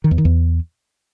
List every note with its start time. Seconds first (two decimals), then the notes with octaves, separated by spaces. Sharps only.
0.04 D#3
0.11 E2
0.18 D#3
0.25 E2